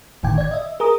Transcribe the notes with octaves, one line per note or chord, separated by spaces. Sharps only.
G1 A2 D3 D#3 G5 G#6
D5 G#6
D#5 E5
G#4 A#4 A#5 D#6